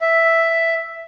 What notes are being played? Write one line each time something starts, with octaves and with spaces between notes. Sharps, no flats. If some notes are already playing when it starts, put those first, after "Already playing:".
E5